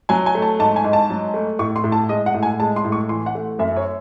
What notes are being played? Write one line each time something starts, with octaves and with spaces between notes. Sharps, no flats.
F#3 G#5
G#5
A3
A5
G#2 A5
G#5
G#2
A5
F#3
A3
A2 C#6
C6
A2
A5
G#3 D#5
F#5
A2
G#5
G#3 A5
C6
A2
C#6
E3 C6
F#5
A3
F#2 E5
C#5